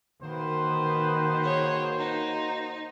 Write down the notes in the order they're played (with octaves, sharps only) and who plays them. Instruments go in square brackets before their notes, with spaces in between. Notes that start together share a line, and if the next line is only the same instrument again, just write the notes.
[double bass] D#3 [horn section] A#3 F#4 C5 [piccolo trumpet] B4
[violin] G#4 C#5
D#4